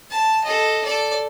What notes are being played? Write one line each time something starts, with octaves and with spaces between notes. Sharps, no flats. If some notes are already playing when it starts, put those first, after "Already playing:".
A5
A4 D#5
A4 D5